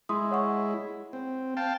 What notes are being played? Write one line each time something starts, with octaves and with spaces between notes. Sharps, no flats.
G#3 E4 C6 D#6
C#5 F#5 C#6
C4
F5 G5 A5